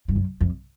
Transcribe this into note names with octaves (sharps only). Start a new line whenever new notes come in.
G2
F#2
F2